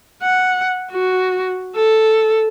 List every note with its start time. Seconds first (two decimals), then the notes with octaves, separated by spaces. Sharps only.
0.22 F#5
0.92 F#4
1.76 A4